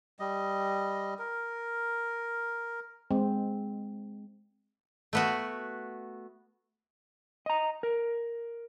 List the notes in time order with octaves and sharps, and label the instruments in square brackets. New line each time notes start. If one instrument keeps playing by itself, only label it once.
[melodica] G3 D#5
A#4
[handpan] G#3 C4
[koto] A3 B3 F#4
[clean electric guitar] D#5 A#5
A#4